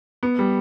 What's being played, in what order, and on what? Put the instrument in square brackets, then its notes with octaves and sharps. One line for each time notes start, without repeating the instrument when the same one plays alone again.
[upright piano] B3
G3